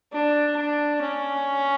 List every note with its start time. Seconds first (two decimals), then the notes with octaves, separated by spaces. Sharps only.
0.12 D4
0.57 D4
1.01 C#4